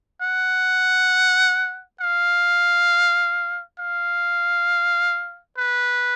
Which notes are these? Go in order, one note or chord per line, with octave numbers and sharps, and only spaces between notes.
F#5
F5
F5
B4